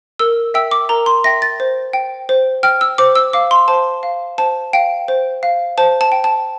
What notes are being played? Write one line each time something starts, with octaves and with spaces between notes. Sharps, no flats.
A#4 E6
E5 G5 E6
D6
A#4 A#5
C6
E5 G5 A#6
A6
C5
G5
C5
G5 F6
E6
C5 D6
E6
F5 D6
C6
C5 A5
F5
C5 A5
F5 G5
C5
F5
C5 A5
A5
G5
A5